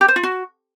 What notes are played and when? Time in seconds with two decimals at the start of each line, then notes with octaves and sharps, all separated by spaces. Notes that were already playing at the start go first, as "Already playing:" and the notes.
0.01 G4
0.08 C5
0.16 F4
0.23 F#4